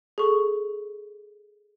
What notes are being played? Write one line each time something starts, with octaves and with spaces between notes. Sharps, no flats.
G#4 A4 C#6